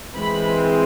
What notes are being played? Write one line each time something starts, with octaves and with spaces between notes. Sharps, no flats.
E3 G#3 C4 B5